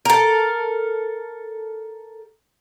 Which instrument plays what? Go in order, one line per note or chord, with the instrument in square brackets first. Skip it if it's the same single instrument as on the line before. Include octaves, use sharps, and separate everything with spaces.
[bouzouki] A4 A#4